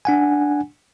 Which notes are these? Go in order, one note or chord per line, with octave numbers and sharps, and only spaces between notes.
D4 F#5 G#5